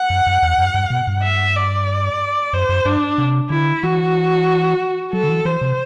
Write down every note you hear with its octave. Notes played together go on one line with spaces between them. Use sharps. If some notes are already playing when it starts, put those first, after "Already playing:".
Already playing: F#5
F#2
F#2
E2
F#2
G2
B2
G2
E5
D5
F#2 C5
F#2
G2 D4
C3
D3 E4
E3 F#4
F#3 A4
D3
E3
E3 C5
C3